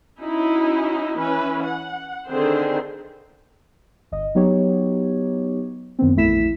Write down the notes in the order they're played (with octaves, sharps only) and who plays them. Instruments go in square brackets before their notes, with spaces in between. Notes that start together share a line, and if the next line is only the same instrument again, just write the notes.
[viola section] C#4 D#4 E4 F#4
E3 C#4 B4
F#5
D3 D#3 C4 G#4 C5
[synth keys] G1 D#5
F#3 B3 D#4 G4 C#5
F#2 D#3 B3 C4
A#1 E2 A3 E4 B6 E7